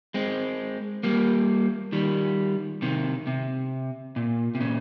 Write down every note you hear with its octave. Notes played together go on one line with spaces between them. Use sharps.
G#3 C4
G3 A#3
D#3 G3
C3 D#3
C3
A#2
C3
A#2 C#3